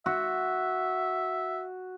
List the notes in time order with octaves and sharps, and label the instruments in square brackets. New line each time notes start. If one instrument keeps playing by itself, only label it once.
[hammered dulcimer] F#4 [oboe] E5